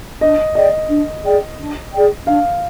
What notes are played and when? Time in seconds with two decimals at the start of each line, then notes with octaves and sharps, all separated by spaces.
0.21 D4 D#5
0.55 G#4 D5 D#5 G5
0.89 D4
1.24 G#4 D5 G5
1.58 D4
1.93 G#4 D5 G5
2.27 D4 F5